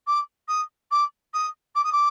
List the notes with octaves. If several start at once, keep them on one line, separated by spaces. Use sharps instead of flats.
D6
D#6
D6
D#6
D6
D#6
D6